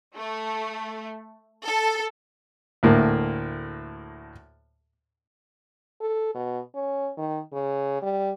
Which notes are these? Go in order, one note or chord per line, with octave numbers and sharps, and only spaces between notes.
A3
A4
D2 A2 A#3
A4
B2
C#4
D#3
C#3
G3